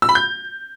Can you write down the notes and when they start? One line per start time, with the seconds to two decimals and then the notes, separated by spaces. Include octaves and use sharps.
0.02 E6
0.09 B5
0.15 G6